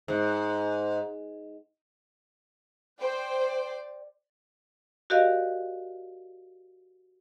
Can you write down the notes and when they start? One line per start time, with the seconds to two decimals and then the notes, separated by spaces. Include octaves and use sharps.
0.08 G#2
3.00 C5 D5 G5
5.10 F#4 G4 A#4 D5 D#5 F5